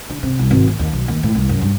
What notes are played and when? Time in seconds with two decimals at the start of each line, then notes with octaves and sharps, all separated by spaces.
0.09 D3
0.23 C3
0.39 C2
0.51 G#1
0.67 D#2
0.79 D#2
0.93 B1
1.08 D#2
1.23 A2
1.35 C2
1.49 F#2
1.61 G2